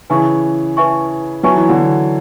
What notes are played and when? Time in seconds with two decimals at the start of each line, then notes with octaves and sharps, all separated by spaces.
0.10 C#3 E3 E4 B4 E5 G#5 C#6
0.77 E4 B4 E5 G#5 C#6
1.43 F#3 E4 B4 E5 G#5 C#6
1.56 E3
1.69 D3 F#3